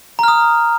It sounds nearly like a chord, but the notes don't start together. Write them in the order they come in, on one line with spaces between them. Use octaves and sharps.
A#5 F6 D#6